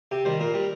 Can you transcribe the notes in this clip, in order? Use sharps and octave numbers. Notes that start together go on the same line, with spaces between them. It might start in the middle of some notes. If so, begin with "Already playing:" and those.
C3 G4
D#3 G3 C5
A#2 A#4
G3